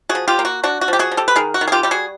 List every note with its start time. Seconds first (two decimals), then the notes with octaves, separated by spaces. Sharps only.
0.09 F#4 G#4
0.15 F3
0.28 F4 G4
0.39 A#3
0.45 F#4
0.63 D4 F#4
0.81 F#4
0.88 F3 G4
0.99 F#4 G#4
1.12 F3
1.17 G4 A4
1.28 B4
1.36 D#3 G#4 A#4
1.54 F#4
1.61 D#3
1.68 G#4
1.72 F4 G4
1.83 G3 G4
1.91 F#4 G#4